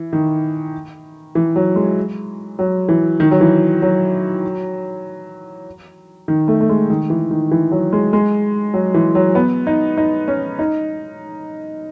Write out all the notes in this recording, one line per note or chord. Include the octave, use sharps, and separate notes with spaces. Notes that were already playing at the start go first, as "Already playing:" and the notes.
Already playing: E3
D#3
E3
F#3
G#3
F#3
E3
D#3
F#3
E3
F#3
D#3
A3
A3
G#3
D#3
E3
D#3
E3
F#3
G#3
G#3
F#3
E3
F#3
B3
D#4
D#4
C#4
D#4